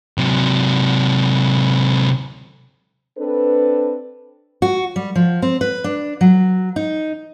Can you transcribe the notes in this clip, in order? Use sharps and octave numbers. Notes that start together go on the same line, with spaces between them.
C3 F#3
C4 D4 A4 B4
F#4
G3
F3
C4
B4
D4
F#3
D#4